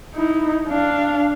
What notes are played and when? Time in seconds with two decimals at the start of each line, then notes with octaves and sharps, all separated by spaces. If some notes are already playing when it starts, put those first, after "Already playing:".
0.14 D#4 E4
0.68 D4 F5